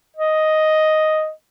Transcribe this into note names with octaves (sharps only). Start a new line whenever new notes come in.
D#5